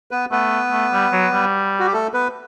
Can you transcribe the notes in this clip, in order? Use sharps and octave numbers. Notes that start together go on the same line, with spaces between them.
B3 B4
A3 B3 B4
A3
G3
F#3
G3
F#4
G4
A3 A4
B3 B4